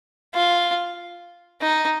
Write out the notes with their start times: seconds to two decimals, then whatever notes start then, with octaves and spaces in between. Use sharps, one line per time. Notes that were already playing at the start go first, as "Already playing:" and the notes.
0.34 F4
1.61 D#4